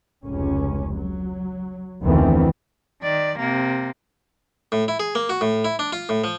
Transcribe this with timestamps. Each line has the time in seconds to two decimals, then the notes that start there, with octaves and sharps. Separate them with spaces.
0.24 F1 C#2 C#4
0.95 F#3
2.01 F1 D2 D#3 E3 B3 C4
3.02 D#3 D5
3.39 C3 A#3
4.72 A2
4.88 E4
5.00 G#4
5.15 A#3
5.29 F#4
5.41 A2
5.65 E4
5.79 D4
5.93 F4
6.09 A2
6.24 F3